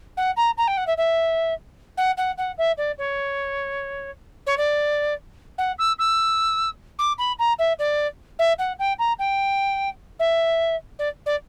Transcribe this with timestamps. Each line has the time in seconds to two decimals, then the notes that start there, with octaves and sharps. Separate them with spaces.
0.17 F#5
0.37 A#5
0.58 A#5
0.68 G5
0.77 F#5
0.87 E5
0.98 E5
1.98 F#5
2.18 F#5
2.38 F#5
2.58 E5
2.78 D5
2.98 C#5
4.47 C#5
4.58 D5
5.58 F#5
5.79 E6
5.99 E6
6.99 D6
7.19 B5
7.39 A#5
7.59 E5
7.79 D5
8.39 E5
8.59 F#5
8.79 G5
8.99 A#5
9.19 G5
10.19 E5
10.99 D5
11.26 D5